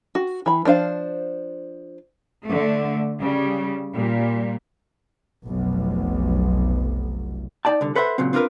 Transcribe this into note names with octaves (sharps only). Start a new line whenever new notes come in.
F#4
E3 B5
F3 D4 C5 F5
D3 A3
C#3 G3
A#2 G3
F1 B1
D#4 D5 G5 A5
C2 D3
A4 B4 C5 E5 F#5
A#2 C#3 F#3 C4
C4 D4 F4 F#4 A#4 B4